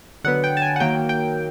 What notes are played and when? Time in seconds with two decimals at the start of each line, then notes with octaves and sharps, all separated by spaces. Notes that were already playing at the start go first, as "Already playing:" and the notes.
0.24 D3 F#3 B3 F#5
0.44 G5
0.57 A5
0.62 G#5
0.76 F#5
0.80 D#3 F#3 A#3 G5
1.09 G5